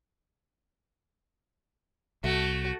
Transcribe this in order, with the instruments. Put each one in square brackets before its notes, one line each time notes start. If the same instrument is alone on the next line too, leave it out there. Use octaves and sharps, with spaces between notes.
[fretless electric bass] C2 [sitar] A3 [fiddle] F#4